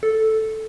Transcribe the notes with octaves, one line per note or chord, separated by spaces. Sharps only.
A4